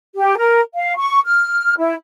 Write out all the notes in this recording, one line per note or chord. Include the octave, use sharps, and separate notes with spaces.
G4
A#4
F5
C#6
F6
E4